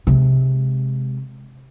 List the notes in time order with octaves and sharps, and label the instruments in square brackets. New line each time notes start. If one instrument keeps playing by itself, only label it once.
[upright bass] C3 G#3